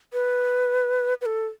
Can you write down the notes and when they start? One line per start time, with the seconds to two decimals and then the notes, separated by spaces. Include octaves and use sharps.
0.13 B4
1.21 B4
1.26 A4